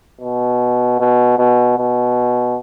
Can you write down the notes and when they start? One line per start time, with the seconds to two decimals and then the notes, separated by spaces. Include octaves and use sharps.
0.21 B2
1.00 B2
1.39 B2
1.78 B2